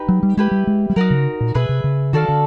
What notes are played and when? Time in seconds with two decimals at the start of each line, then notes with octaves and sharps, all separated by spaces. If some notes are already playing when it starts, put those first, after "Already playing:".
Already playing: D#4 G4 B4
0.09 F#3
0.23 G3
0.37 G#3 E4 G4 B4
0.51 G3
0.67 G#3
0.90 G3
0.96 F#3 D#4 F#4 A#4
1.10 C#3
1.40 A#2
1.54 B2 G#4 B4 E5
1.69 C3
1.84 C#3
2.13 D#3 F#4 A4 D5 F5
2.28 D3